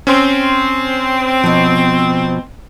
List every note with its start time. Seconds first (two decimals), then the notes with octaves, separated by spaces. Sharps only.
0.07 C4 C#4 C6
1.44 B2 F3